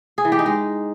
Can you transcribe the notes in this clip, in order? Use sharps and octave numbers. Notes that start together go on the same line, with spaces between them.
G#4
E3
G4
D#4
G#3